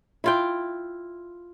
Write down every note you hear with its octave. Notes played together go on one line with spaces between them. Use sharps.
E4 F4 G5